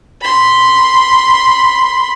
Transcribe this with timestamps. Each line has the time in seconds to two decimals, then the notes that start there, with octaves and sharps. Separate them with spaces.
0.21 B5 C6